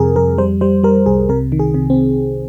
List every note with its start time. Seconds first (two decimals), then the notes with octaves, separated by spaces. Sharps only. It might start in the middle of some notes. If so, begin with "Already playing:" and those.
Already playing: F2 C3 G3 G#4 A#4
0.16 F2 A#4
0.38 G3 C5
0.61 G3 C5
0.83 G3 A#4
1.06 C2 G#4
1.29 C3 A#4
1.52 D#3
1.59 G#4
1.74 C3
1.90 C4